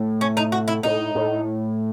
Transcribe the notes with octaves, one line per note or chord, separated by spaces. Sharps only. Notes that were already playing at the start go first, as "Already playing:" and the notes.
Already playing: A2
C#4
D#4
F#4
E4
A2 D#4
A2